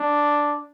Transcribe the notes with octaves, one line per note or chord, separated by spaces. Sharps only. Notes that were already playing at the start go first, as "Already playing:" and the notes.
Already playing: D4